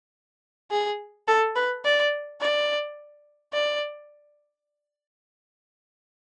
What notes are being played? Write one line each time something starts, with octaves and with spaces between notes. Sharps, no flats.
G#4
A4
B4
D5
D5
D5